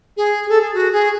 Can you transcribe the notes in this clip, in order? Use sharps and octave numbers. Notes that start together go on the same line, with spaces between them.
G#4
A4
G#4
F#4
G#4